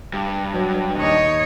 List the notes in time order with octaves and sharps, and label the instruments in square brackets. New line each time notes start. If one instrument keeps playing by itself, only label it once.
[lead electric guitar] G2
[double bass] F#3
[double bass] D#2 D#4 [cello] C#5 D#5